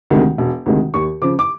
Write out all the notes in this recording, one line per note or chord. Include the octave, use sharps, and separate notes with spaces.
D2 C3 D#3 G#3
E1
D2 C3 D#3 G#3
D#2 C#6
C#3 F3 D6
D6